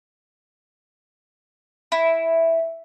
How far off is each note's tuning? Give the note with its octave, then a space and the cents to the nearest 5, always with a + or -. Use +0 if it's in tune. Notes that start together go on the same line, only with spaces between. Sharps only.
E4 -5